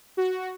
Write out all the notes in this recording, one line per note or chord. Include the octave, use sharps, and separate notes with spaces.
F#4